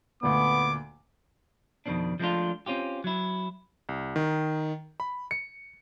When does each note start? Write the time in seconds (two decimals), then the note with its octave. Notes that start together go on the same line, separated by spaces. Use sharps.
0.23 D2 A#2 B3 D6
1.86 F2 B2 D#3 C4 D4
2.20 F3 G#3 A3 C#4 D4 F4
2.66 C4 C#4 F4 G4
3.04 F#3 E4
3.89 C2
4.16 D#3
5.00 B5
5.31 C#7